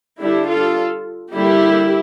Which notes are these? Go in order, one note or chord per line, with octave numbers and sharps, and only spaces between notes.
D3 G3 D4 E4 G4
F4 A4
D3 G3 A#3 E4 G4